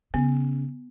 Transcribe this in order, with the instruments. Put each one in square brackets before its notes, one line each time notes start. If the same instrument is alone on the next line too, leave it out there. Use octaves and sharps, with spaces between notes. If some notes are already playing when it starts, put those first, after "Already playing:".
[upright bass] C#3 [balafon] B3